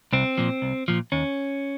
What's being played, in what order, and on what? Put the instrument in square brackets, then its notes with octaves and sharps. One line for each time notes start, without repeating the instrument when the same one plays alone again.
[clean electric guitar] C2 C4
A#2 F3
C2
A#2 F3
D#2 C#4